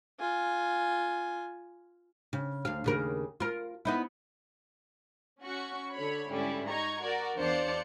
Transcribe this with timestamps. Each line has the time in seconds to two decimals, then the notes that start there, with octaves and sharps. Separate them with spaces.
0.20 F4 G#5
2.33 C#3
2.65 D2 F5
2.84 D#2 C#3 A#4
3.40 F4 A#4
3.85 B3 D#4 E4
5.41 C#4 F#4 C#6
5.92 D3 C#5 B5
6.30 G#2 D3 G3 C#4 E4
6.68 D#4 A#5 C#6 G#6
7.02 F#4 A#4 D5
7.36 E2 D4 C5 D5 F5 C#7